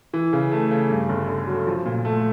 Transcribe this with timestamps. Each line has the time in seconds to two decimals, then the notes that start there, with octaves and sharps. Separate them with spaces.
0.14 E3
0.33 C#3
0.52 A3
0.71 C#3
0.90 G2
1.09 G1
1.28 D3
1.47 F#3
1.67 F3
1.85 A#2
2.05 A3